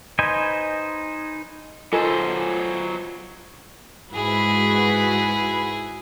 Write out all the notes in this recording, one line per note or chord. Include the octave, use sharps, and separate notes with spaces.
D#4 B4 C5 D#5 G#5
F#3 B3 F4 A4 C5 D#5 G#5
G#2 E4 F#4 G#4 B4